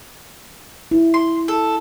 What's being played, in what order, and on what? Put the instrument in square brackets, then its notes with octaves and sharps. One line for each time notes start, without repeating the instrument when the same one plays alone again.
[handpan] E4
[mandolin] C6
A4